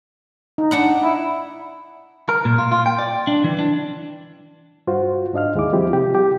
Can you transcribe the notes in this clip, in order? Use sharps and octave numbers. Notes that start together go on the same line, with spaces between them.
D#4
D4 F#5 B5
E4
A#4
A#2
F4
F4
G5
D5
D4
E3
D4
G2 F4 F#4 C5
G#2 D4 D#5 F5 F6
D#2 G#3 E4 D6
F3 G3 C4 E4 F4 G4
C3 G4
G3 F4 G4